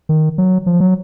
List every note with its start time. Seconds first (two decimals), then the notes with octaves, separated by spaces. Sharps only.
0.09 D#3
0.38 F#3
0.66 F3
0.80 F#3